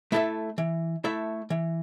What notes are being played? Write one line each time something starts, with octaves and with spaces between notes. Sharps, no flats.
A3 E4 A4 E5
E3
A3 E4 A4 E5
E3